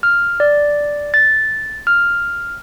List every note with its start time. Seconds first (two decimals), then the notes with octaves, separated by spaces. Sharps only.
0.03 F6
0.40 D5
1.14 A6
1.87 F6